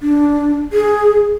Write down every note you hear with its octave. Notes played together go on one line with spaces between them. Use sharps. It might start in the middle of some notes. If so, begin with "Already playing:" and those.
D4
G#4